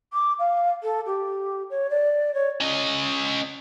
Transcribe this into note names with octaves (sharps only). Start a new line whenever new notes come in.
D6
F5
A4
G4
C#5
D5
C#5
C#4 D#5